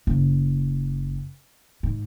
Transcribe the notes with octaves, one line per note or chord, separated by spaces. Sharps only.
F#1
G#2